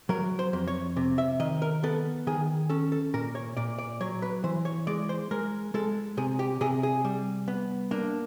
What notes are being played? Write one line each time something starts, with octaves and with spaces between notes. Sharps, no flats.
F#3 A#4
C5
F2
C#5
C3
E5
D#3 D#5
A#4
B3 A4
D#3 G#4
C#4 A4
A4
A#2 A#4
C#5
A#2 D5
D5
F#3 C#5
B4
E3 C5
C#5
G#3 D5
C5
G#3 A#4
G#3 A4
C3 G#4
G4
C3 G#4
G#4
G3
B3
A#3 D4